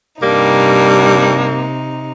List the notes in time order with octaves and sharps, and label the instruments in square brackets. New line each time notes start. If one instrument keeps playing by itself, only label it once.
[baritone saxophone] G2 [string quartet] C3 D#4 [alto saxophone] G3 [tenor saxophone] A#3